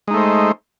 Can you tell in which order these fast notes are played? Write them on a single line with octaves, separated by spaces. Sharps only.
G#3 D#4 A3 C5